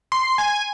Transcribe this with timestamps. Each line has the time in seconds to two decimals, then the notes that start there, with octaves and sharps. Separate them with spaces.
0.12 C6
0.38 G#5